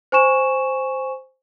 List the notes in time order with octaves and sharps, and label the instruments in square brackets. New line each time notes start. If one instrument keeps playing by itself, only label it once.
[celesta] C5 G#5 C#6 E7